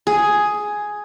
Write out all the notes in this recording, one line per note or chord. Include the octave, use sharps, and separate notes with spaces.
G#4